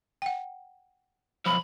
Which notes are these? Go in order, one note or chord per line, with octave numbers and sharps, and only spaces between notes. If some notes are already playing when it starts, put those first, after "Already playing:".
F#5 G5
B1 F2 B5